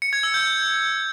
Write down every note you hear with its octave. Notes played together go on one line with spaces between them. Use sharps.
C#7
G#6
E6
G6